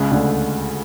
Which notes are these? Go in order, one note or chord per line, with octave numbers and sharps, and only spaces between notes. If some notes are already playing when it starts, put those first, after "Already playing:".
Already playing: C#2 C#3
D2 D3